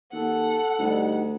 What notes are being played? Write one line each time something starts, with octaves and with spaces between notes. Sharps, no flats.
D#2 A4 F#5
D2 G3 D#4